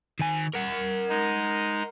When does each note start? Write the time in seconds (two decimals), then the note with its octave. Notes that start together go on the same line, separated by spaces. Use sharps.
0.19 D#3 G#5
0.53 A#4 F#5
1.09 G#3 D#4